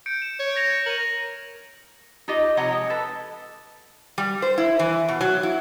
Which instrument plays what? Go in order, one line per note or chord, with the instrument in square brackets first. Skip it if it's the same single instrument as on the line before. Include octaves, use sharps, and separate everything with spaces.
[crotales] G6 C#7 D7
E7
[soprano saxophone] C#5
[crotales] G#6 A#6 F7
[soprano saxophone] A#4 [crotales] D#7 F#7
[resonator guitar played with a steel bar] D#4 F4 G4 D#5
C3 F3 C#5 D#5 F#5 A#5
G#3
A4 B4
G3
C5
E4
E3
B2
F#3
E4